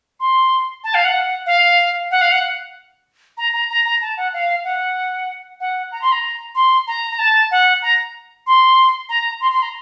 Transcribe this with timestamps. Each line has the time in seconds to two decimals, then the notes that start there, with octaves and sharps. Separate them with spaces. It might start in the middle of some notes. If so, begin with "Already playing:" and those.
0.20 C6
0.84 A5
0.95 F5
1.05 F#5
1.46 F5
2.11 F#5
2.21 F5
2.32 F#5
3.38 A#5
3.53 A#5
3.70 A#5
3.85 A#5
4.01 A5
4.17 F#5
4.33 F5
4.64 F#5
5.60 F#5
5.92 A#5
6.02 C6
6.12 A#5
6.55 C6
6.87 A#5
7.11 A#5
7.19 A5
7.51 F#5
7.82 A#5
8.47 C6
9.09 A#5
9.41 C6
9.52 C6
9.62 A#5